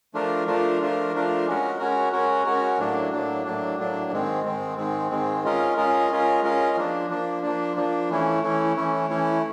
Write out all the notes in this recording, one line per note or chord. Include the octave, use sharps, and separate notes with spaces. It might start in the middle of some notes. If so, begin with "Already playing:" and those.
F3 A3 D4 F4 A#4
F3 A3 D4 F4 A#4
F3 A3 D4 F4 A#4
F3 A3 D4 F4 A#4
G#3 C#4 F#4 A#4
G#3 C#4 F#4 A#4
G#3 C#4 F#4 A#4
G#3 C#4 F#4 A#4
A2 F#3 A#3 D4
A2 F#3 A#3 D4
A2 F#3 A#3 D4
A2 F#3 A#3 D4
G#2 D#3 G#3 C4
G#2 D#3 G#3 C4
G#2 D#3 G#3 C4
G#2 D#3 G#3 C4
G#3 C#4 F4 A#4 D#5
G#3 C#4 F4 A#4 D#5
G#3 C#4 F4 A#4 D#5
G#3 C#4 F4 A#4 D#5
F3 A#3 D4
F3 A#3 D4
F3 A#3 D4
F3 A#3 D4
E3 A3 C#4 E4
E3 A3 C#4 E4
E3 A3 C#4 E4
E3 A3 C#4 E4